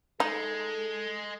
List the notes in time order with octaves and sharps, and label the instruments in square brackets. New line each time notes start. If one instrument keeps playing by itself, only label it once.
[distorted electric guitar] G#3 [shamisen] D#4 [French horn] A4